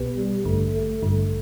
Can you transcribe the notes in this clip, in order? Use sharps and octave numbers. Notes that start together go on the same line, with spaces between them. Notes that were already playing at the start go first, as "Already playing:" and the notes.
Already playing: B1 B2 B3 G4 B4
G3
A1 G2 D3 A3
A3
A1 G2 D3 A3